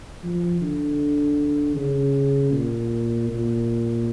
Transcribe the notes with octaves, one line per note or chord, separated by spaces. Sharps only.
F3
D3
C#3
A#2
A#2